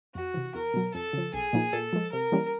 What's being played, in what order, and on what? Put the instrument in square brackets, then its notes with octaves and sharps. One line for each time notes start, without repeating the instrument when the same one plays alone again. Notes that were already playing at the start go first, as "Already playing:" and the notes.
[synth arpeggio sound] F2 [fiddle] F#4
[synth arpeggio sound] C3 E3
[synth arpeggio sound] E2 [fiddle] A#4
[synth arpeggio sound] B2 F#3
[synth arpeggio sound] F2 [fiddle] A4
[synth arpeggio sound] C#3 F3
[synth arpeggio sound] B1 [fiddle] G#4
[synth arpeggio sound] A#2 F3 A#3 D#4
[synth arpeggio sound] A#2 [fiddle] A4
[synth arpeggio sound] F3 G#3
[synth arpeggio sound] C3 [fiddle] A#4
[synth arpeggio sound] E3 G3 A#3 C#4